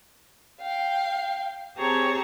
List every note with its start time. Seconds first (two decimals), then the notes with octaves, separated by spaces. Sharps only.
0.60 F5 G5
1.76 C4 G4 G#4 C#5 A5 A#5